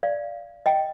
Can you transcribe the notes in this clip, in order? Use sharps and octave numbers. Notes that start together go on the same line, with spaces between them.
D5 F5
D#5 G5